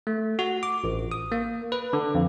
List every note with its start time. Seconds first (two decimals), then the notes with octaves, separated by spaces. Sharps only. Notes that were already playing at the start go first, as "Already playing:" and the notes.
0.07 A3
0.39 F#4
0.63 D6
0.84 A1
1.12 D#6
1.32 A#3
1.72 B4
1.93 D3
2.15 F2